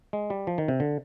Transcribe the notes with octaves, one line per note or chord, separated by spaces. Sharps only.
G#3
G3
F3
D#3
C3
D3